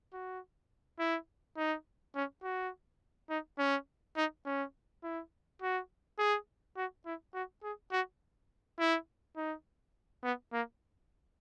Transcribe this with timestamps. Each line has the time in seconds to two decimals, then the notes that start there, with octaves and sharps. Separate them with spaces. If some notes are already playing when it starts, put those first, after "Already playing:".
0.13 F#4
0.99 E4
1.57 D#4
2.15 C#4
2.43 F#4
3.30 D#4
3.59 C#4
4.16 D#4
4.46 C#4
5.03 E4
5.62 F#4
6.19 G#4
6.77 F#4
7.06 E4
7.34 F#4
7.63 G#4
7.92 F#4
8.79 E4
9.37 D#4
10.24 B3
10.53 A#3